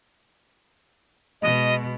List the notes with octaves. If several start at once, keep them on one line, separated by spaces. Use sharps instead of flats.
B2 G#3 D#5